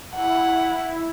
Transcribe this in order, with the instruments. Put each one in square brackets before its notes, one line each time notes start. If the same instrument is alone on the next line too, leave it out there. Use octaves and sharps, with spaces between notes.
[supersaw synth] E4 [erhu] F#5